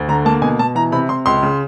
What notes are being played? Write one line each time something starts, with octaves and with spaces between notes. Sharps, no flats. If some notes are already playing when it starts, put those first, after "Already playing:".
Already playing: D2
D3 A#5
A#3 A5
B2 G#5
B2 A5
E3 A#5
C3 B5
C3 C6
C#2 C6
C#3